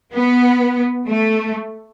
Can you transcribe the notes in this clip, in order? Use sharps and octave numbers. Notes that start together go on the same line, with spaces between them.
B3
A3